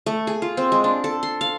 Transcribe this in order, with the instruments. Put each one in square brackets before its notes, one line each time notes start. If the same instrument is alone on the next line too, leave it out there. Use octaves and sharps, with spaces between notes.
[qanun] A3
G#4
F4
C4
G#3
D4
A4
C6
F5